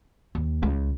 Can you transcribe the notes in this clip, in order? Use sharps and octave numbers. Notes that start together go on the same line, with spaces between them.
D#2
C#2